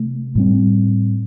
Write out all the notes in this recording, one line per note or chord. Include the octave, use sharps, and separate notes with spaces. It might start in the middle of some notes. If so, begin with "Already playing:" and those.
Already playing: C3 A3
A2 G3 C4